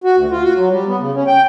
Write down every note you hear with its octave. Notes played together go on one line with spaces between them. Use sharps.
F#4
D2
F4
F#4
F#3
G3
B3
C#3
C#4
G5